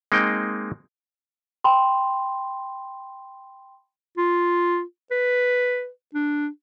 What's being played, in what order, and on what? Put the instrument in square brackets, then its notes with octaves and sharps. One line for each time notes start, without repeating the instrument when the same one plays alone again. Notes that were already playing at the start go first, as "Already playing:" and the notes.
[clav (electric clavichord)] G#3 A#3 C4 D#4 G5
[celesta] G5 B5 C6
[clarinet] F4
B4
D4